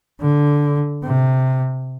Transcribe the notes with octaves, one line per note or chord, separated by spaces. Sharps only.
D3
C3